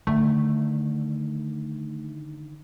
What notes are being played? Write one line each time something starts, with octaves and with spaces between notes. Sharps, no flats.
D3 D#3 A3